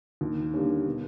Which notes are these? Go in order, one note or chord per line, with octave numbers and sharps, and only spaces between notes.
D#2
D3 G3 A#3 C#4
B2